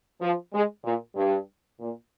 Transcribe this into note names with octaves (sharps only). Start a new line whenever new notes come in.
F3
G#3
A#2
G2
A#2